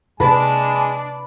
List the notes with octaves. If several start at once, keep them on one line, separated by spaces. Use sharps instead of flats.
C3 G#3 A#3 D4 B4 D5 A5